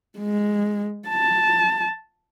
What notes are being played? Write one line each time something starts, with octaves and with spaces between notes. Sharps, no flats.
G#3
A5